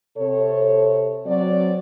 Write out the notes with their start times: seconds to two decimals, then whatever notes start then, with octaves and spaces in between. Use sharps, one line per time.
0.17 C3 A4 C#5
1.26 F#3 C4 D5